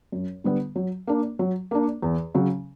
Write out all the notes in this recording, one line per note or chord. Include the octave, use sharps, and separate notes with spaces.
F#2
D3 G3 B3
F#3
A#3 D4
F#3
A#3 D4
E2
C#3 F#3